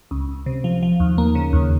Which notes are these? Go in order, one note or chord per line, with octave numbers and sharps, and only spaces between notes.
C#2
C#2
C3
F3
F3
D#2
A#3
C#3
D#2